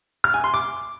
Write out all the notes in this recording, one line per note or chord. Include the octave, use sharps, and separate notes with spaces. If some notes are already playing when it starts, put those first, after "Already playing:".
F6
G#5
C6
D6